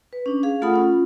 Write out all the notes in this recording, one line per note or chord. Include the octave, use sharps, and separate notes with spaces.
B4
C#4 D4
G#4 F5
A3 F4 A4 F#5 B5 D#6
C#4 F4